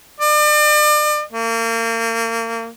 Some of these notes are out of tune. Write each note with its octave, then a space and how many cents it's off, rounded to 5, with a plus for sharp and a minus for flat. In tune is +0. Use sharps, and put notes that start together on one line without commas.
D5 +40
A#3 -35